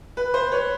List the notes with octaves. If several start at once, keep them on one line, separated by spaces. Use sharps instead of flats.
B4
C5
B4 C#5